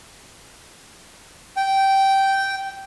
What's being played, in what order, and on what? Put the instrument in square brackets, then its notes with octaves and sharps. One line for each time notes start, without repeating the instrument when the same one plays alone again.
[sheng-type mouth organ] G5